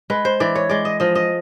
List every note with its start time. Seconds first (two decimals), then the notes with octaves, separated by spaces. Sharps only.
0.10 G#3 B4
0.25 C5
0.40 E3 D5
0.55 C#5
0.69 G#3 D5
0.85 D#5
1.00 F3 D#5
1.15 D#5